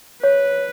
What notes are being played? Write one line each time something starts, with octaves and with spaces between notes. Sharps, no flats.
B4 C#5